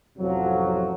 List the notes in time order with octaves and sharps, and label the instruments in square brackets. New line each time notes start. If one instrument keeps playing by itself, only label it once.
[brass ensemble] A1 F2 C3 F3 F#3